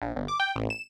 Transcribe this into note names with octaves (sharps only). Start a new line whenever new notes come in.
A#1
G1
D6
G5
A1
E7